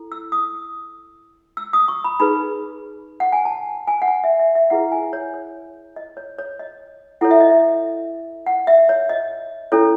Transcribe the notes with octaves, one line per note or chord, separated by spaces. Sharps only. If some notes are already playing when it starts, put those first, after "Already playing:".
Already playing: E4 A4
E6
D#6
E6
D#6
C#6
B5
D#4 G#4 B4 B5
F#5
G#5
A5
G#5
F#5
G#5
E5
E5
E5
E4 G#4 B4 F#5
G#5
C#5
C#5
D#5
C#5
C#5
D#5
E4 A4 C#5 F#5
E5
D#5
E5
F#5
E5
C#5
D#5
C#4 E4 A4 C#5